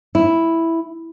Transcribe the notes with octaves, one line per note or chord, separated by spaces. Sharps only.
E4